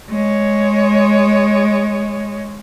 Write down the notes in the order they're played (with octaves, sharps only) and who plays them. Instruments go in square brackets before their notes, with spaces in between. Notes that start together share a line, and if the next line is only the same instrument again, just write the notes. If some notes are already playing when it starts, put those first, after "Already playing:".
[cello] G#3 C#5